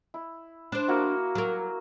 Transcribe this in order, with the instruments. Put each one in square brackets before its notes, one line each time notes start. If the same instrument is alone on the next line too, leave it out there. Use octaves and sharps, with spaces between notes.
[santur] E4
[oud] D4 C5
[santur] A#3 E4 F#4
[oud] F#3 A#4